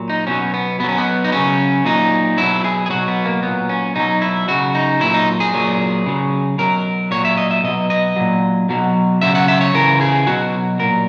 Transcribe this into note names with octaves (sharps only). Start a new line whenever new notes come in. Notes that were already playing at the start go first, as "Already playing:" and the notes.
Already playing: A#2 F#3
D#4
B2 F#3 C#4
B3
B2 F#3 B3 C#4
B3
D#4
C#3 F#3 C#4
A#2 F#3 D#4
B2 F#3 E4
G#4
G#4
B2 F#3 F#4
B3
A#3
A#2 F#3 B3
C#4
B2 F#3 D#4
E4
C#3 F#3 F#4
D#4
A#2 F#3 E4
D#4
G#4
A#2 F#3
C#3 F#3
B2 F#3 A#4
A#2 F#3 C#5
E5
D#5
E5
B2 F#3 D#5
D#5
A#2 F#3
B2 F#3
C#3 F#3 E5
F#5
E5
C#5
C#3 E3 A#4
G#4
B2 F#3 F#4
A#2 F#3 A#4